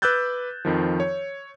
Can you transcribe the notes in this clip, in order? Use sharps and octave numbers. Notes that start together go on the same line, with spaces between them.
B4 D6 E6 F#6 G6 A6
F2 D#3 F3
C#5